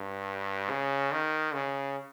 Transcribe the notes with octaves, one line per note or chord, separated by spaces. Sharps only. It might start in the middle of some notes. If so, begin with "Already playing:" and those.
Already playing: G2
C#3
D#3
C#3